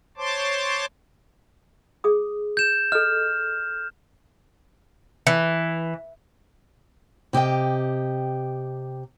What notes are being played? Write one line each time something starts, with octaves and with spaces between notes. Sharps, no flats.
C5 C#5 A5 C6 D6
G#4 D#6
G6 E7
A4 D#5 F6
E3
C3 G4 D#5 G5